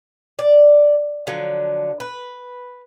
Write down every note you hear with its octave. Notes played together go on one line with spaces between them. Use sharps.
D5
D3 F3 F#3
B4